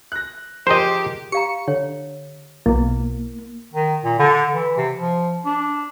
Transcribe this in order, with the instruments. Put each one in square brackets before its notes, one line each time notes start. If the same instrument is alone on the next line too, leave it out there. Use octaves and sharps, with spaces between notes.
[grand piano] F#6 A#6
[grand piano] F3 G#4 A#4 [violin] G4 [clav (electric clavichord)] C5 D#5
[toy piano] G4 F5 A#5 [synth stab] C#7
[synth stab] D3 [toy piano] C#5
[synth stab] B1 B2 [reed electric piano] A#3 [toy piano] E4
[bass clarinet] D#3
A#2
D3
E3
C3
F3
D4